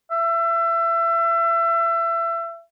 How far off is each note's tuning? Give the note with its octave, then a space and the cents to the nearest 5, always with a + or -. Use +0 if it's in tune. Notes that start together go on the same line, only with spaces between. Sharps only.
E5 +30